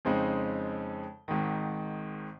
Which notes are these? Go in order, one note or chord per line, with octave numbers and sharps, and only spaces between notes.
F2 C#3 G#3 C4 D#4
G#1 G#2 D#3